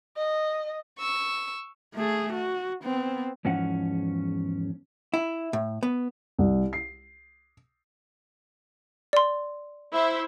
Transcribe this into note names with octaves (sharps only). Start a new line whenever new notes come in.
D#5
C#6 E6
A3 G#4
F#4
B3 C4
E2 G#2 F3 C#4 F#5
E4
A2
B3
C2
C7
D5 C6
E4 C5 E5